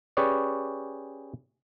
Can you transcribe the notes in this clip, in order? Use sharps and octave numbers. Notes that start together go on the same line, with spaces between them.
C#4 G4 G#4 B4 C#5 D5